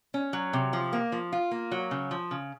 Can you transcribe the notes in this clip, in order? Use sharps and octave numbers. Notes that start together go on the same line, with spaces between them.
C#4
F#3
C3
F3
A#3
F3
F4
A#3
F#3
C#3
F3
C#3